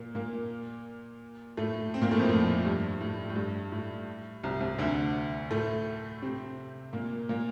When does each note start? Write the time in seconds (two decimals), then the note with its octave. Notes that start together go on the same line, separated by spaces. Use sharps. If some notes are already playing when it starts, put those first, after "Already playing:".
Already playing: A#2 A#3
0.15 A#2 A#3
1.57 A2 A3
1.94 C4
2.02 A#2 A#3
2.11 A2 A3
2.20 F2 F3
2.29 A2
2.65 G2
3.01 A2
3.29 A2
3.36 G2
3.72 A2
4.43 C2 C3
4.61 C2 C3
4.78 D2 D3
5.51 A2 A3
6.22 C3 C4
6.93 A#2 A#3
7.29 A#2 A#3